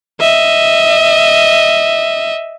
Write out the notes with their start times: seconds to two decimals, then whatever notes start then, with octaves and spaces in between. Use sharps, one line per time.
0.20 D#5 E5